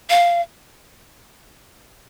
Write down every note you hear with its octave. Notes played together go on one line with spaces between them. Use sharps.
F5